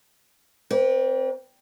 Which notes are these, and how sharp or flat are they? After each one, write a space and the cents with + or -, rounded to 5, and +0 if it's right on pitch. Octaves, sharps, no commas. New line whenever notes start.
C4 +0 B4 -40 D5 -35